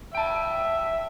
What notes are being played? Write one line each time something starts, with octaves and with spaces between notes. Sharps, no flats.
E5 G5 A5